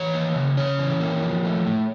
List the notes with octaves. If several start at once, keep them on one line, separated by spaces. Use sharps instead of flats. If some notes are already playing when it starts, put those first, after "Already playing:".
Already playing: E3 C#5
A#3
C#3
C#4 C#5
E3
A#3
F3
A3
A2